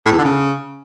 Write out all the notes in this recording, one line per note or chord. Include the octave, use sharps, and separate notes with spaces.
A2
E2
D3
C#3